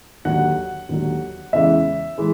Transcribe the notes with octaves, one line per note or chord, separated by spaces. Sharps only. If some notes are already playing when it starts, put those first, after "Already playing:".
D#2 D3 F#3 F#5
D#2 D3 F#3
E2 C#3 E3 G#3 E5
E3 G#3